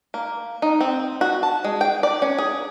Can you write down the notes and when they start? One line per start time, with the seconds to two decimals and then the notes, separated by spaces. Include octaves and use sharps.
0.14 A#3
0.62 D#4
0.80 C4
1.21 F#4
1.43 A5
1.65 G#3
1.81 G5
2.03 D5
2.22 C#4
2.39 G#4